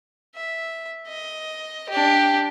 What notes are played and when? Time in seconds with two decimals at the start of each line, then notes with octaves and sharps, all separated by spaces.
0.35 E5
1.08 D#5
1.89 D4 G4